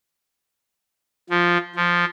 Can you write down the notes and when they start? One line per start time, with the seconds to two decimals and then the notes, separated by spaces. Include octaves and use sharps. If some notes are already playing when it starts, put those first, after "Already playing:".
1.30 F3
1.76 F3